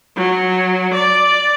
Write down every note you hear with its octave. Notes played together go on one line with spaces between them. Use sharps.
F#3
D5